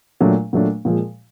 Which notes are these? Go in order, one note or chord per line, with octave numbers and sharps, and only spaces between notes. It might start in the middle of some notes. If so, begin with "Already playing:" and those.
A#2 F#3 A3 D4
A#2 F#3 A3 D4
A#2 F3 G#3